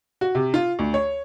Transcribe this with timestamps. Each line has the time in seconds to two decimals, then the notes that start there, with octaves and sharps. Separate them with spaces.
0.21 F#4
0.35 C3
0.54 F4
0.79 D2
0.94 C#5